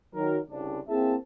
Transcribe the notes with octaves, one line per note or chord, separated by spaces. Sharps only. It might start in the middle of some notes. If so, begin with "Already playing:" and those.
D#3 F#3 A#4
C2 C#3 D4
A#3 C4 E4 G#4 E5 A5